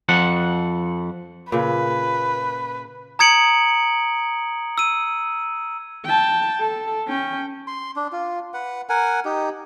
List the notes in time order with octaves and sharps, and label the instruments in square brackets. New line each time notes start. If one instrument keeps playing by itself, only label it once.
[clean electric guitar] F2 F3 F#5
[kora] A#2 C#3 [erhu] B4
[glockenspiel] A#5 D#6 G#6 C#7 D7 F#7
E6 D#7
[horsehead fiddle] G5 A5
A4
C#4 G5
[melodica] C6
D4
F4
B4 F#5
A#4 F#5 G#5
D#4 G4